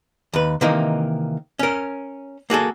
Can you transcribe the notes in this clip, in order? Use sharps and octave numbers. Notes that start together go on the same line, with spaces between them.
D#2 B4
C3 D#3 E3 A#3 D#4
C#4 A#4
A#3 F#4 G#4 A4